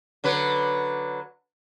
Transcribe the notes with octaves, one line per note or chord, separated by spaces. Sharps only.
D3 F#3 B4